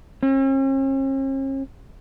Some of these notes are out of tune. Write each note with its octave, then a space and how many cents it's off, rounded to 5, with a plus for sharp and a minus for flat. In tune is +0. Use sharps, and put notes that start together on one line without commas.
C#4 -45